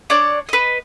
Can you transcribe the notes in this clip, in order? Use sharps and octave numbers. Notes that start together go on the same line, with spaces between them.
D4 C#5 D5
B4 D#5